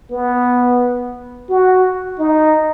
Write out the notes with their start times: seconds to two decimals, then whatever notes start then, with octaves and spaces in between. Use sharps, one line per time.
0.11 B3
1.49 F#4
2.18 D#4